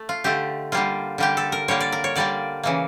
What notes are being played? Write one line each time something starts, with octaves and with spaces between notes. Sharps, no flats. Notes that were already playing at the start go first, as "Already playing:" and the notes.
Already playing: A3
F4
D3 A3 G4
D3 G3 A#3 F4
D3 G3 A#3 G4
A4
A#4
D3 G3 A#3 C#5
D5
A#4
C#5
D3 G3 A#3 D5
C#3 E3 A#3